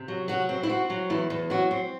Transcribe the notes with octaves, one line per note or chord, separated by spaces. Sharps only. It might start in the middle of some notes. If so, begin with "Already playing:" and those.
Already playing: C3
F#3
F#3 F#4
C4
E4
C4 F#4
F#3
E2 E4
E2
F#3 F#4
C4